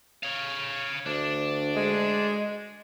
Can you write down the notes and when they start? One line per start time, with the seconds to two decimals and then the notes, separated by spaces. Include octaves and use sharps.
0.23 C#5 F5
1.06 D2 D4
1.75 G#3